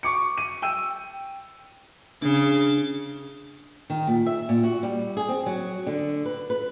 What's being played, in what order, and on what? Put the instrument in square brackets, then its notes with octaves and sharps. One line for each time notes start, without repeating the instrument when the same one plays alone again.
[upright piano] C#6 D6 C#7
D#7
G5 E6 D#7
[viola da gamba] C#3 [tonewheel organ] D4
[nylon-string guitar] D#3
A#2
E5
A#2
F#4
G3
G#4
C4
F#3
D3
B4
B4